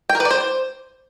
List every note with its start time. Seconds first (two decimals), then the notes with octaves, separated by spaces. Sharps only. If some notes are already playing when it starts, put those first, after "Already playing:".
0.09 G5
0.15 A#4
0.20 B4
0.25 D5
0.31 C5